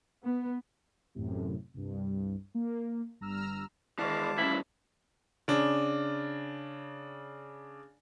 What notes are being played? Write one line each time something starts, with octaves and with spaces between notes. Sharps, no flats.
B3
A1 F#2 A2 C3
C2 G2
A#3
G1 G2 A#5 E6 F6
D#3 E3 G#3 D5 F5 A5 D6
G2 E3 A3 C#4 E4
C#3 D4